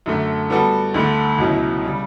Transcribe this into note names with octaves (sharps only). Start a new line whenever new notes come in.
F#2 D3 A3
G3 B3 F#4 A4
D2 D3 A3
C#2 B2 F#3 C#4 E4
C#3 G3